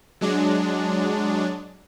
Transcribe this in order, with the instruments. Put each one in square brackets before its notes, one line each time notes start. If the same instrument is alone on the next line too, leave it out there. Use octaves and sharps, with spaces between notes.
[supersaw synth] F#3 G#3 D4